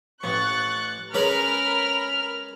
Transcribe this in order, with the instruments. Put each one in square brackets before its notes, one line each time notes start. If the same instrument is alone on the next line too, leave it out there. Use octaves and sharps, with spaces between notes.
[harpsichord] A1 [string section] C#6 F#6 A6
[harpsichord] G#3 C#4 B4 [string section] A#4 B5 F6